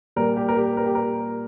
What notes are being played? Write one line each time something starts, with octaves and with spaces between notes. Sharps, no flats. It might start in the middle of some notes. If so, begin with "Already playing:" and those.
A#2 G3 A#4
G4
A#4
G4
A#4
G4
A#4